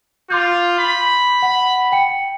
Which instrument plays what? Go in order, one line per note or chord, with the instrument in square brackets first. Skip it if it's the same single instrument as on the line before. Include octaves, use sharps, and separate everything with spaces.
[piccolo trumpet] F4 [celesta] C6 D6 G6
[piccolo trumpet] B5
[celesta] F#5
G5 C#7